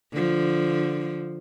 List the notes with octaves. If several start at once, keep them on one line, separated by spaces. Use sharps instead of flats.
D3 F3